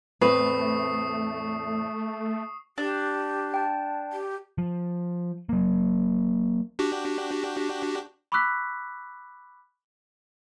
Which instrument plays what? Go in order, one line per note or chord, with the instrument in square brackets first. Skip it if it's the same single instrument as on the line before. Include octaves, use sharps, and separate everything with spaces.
[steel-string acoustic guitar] E2 A2 C4 [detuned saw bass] A3 [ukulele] B4 [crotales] C#6 D#6 C7
[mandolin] D4 [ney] G4
[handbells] G5 A5
[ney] G4
[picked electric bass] F3
F#3 A#3
[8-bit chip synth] D4 F#4 G4
[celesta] B5 C#6 D6 E6 F#6 B6